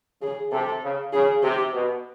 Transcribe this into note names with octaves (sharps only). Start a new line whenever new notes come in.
C#3 G#4
C3 A4
C#3
C#3 G#4
C3 G4
B2